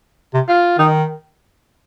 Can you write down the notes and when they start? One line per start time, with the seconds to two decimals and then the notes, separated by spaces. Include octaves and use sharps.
0.34 C3
0.49 F4
0.78 D#3 D#4